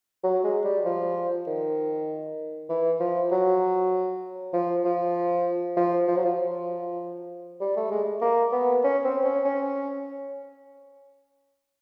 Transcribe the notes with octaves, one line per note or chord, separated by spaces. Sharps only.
F#3
G#3
G3
F3
D#3
E3
F3
F#3
F3
F3
F3
F3
F#3
F3
G3
A3
G#3
A#3
B3
C#4
C4
C#4
C#4